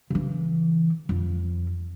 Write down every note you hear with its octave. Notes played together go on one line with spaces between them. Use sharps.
C#3 E3
F2